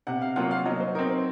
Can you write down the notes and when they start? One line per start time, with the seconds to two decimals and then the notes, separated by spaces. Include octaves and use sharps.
0.07 C3 F#5
0.22 F5
0.36 F#3 A#3 F4 F#5
0.51 F5
0.66 F#3 D#5
0.80 C5
0.95 C4 D#4 A#4
1.10 C5